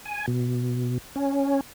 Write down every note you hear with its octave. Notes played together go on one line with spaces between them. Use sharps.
G#5
B2
C#4